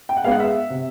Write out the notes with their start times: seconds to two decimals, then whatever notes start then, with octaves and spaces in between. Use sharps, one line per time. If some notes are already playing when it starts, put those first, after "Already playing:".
0.09 G5
0.17 F#5
0.24 G#3 B3 F5
0.31 F#5
0.40 E5
0.70 C3